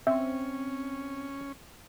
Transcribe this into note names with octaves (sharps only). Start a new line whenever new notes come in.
C4 C#4 E5